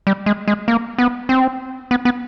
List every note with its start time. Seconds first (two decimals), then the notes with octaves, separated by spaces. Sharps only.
0.07 G3
0.26 G#3
0.48 G#3
0.68 A#3
0.98 B3
1.29 C4
1.91 B3
2.05 B3